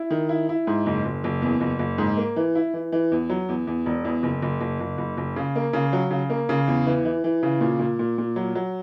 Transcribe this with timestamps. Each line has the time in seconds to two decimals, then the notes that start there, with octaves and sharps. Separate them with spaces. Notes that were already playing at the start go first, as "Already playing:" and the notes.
Already playing: E4
0.10 D#3
0.29 E4
0.49 E4
0.67 G#2
0.86 F#1
1.05 F#1
1.24 F#1
1.42 E2
1.61 F#1
1.79 F#1
1.98 G#2
2.17 A#3
2.36 E3
2.55 E4
2.74 E3
2.92 E3
3.12 E2
3.29 F#3
3.49 E2
3.67 E2
3.86 E1
4.05 E2
4.23 F#1
4.42 F#1
4.61 F#1
4.80 F#1
4.98 F#1
5.17 F#1
5.36 C#3
5.55 A#3
5.73 C#3
5.93 F#3
6.11 C#3
6.30 A#3
6.49 C#3
6.68 E2
6.86 E3
7.05 E3
7.24 E3
7.43 C#3
7.61 A#2
7.79 A#2
7.99 A#2
8.18 A#2
8.36 F#3
8.55 F#3